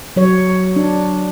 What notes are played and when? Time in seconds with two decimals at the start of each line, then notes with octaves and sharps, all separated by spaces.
0.16 F#3 C#5
0.76 D4